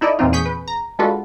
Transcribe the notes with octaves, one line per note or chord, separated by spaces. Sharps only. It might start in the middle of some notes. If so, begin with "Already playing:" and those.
D#4 E4 A4 D5 D#5
E2 A#2 E3 C4 D#4 F4
G#4 C#6 G6 B6
B4
A#5
G#3 D4 F4 F#4 A4 B4